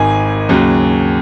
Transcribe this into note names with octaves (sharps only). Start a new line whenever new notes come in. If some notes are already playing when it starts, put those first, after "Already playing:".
Already playing: G#1 G#2 D#3 G#5
D#2 C#3 F#3